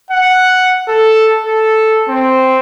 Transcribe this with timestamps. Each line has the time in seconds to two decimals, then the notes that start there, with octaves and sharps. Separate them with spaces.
0.11 F#5
0.89 A4
1.46 A4
2.09 C4